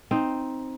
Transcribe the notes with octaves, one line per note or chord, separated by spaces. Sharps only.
C4 D#4